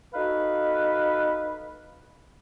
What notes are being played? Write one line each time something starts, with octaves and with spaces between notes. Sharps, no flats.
D#4 F#4 A4 B4 F5